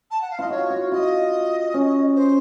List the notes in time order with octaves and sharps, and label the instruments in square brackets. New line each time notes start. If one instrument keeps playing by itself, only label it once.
[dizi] A5
F#5
F5
[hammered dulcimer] F4 [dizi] D#5
[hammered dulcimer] F#4 [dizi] C#5
[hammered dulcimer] F#4
[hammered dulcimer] F4 [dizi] D#5
[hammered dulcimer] C#4
[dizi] C5